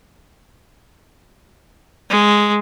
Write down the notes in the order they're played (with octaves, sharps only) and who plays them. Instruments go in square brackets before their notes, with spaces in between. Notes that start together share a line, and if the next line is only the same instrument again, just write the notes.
[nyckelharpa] G#3